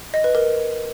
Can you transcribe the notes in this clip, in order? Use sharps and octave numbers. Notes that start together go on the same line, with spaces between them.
D#5
B4
A#4